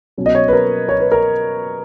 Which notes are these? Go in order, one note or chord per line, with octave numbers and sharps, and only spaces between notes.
B2 F#3 C#4
D#5
C#5
B4
A#4
C#5
B4
A#4